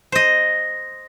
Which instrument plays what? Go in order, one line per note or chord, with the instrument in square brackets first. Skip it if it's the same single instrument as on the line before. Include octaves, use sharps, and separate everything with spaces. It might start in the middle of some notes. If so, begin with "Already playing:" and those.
[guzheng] C5 D#5